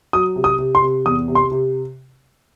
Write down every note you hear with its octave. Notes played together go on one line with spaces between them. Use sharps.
F#3 D#6
C3
D#6
C3
C6
C3
E2 D#6
C3
C6
C3